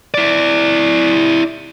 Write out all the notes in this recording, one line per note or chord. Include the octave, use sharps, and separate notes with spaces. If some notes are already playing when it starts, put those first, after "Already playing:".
E4 D5